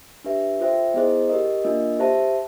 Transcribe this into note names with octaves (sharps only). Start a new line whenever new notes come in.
D4 G4 B4 E5
F4 A4 C5 E5 G5
B3 E4 G#4 C5 D#5
G4 A#4 D#5
A#3 D4 F4 A#4 D#5
G4 C5 E5 A5